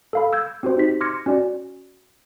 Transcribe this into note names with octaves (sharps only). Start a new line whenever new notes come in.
A4 F5 B5
E6 G6 G#6
C4 F#4 G4 C5
D#4 G4 B6
C6 D6 F6 G#6 A#6 C#7
C#4 F#4 D5